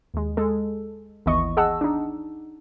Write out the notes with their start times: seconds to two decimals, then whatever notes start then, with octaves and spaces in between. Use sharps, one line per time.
0.14 D#2 G#3
0.37 G#3 A4
1.26 G#1 D#2 E3 B3 D#5 C#6
1.57 G#4 D#5 F#5 A5 E6
1.81 D4 D#4